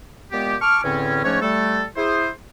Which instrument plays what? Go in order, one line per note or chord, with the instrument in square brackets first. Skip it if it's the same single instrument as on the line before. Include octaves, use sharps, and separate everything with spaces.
[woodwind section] A#2 G#3 B3 G4
A5 C#6 D6 F6
E2 A2 D3 C4 C#4
G#2 F3 A3 C#4 D4 C#5
G3 A3 A4
E4 G#4 C5